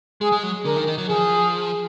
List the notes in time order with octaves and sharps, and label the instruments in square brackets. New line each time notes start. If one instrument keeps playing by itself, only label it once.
[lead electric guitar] G#3 [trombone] G#4
[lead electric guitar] G#3
F#3
[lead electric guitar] D3 [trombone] A#4
[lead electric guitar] D#3
D#3
F#3
[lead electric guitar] F3 [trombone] G#4